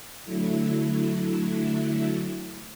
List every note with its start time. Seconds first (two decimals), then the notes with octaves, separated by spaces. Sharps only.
0.24 D3 F#3 A3 E4